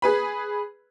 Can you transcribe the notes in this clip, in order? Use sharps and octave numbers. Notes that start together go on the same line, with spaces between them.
G#4 B4 B5